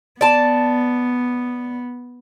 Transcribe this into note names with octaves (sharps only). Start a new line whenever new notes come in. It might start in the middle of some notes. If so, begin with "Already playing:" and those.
B3 D5 A5